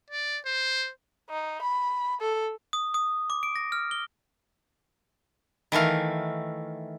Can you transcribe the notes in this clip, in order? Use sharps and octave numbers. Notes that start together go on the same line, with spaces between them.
D5
C5
D#4
B5
A4
D#6
D#6
D6
D7
A#6
F6
G7
D#3 E3 A3 F5